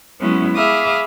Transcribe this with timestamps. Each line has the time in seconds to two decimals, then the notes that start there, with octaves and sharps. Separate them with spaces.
0.21 F#3 G#3 B3 C#4 E4
0.56 G#4 E5 F5 B5 D6 D#6